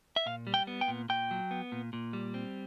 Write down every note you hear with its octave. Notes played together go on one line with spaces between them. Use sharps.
E5
A#2 F5
G3
G5
B3
G5
A#2
A#2 G5
F#3
B3
A#2
A#2
G3
C4